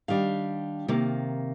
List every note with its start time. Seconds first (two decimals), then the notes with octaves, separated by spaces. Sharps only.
0.08 D#3 G3 D4 F5
0.88 C3 D#3 A#3